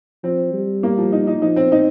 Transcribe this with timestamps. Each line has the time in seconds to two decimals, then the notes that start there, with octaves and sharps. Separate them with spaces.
0.24 F3 C4
0.53 G3
0.83 A#3
0.98 F3
1.12 D#4
1.27 D#4
1.42 F3 D#4
1.56 C4
1.72 D#4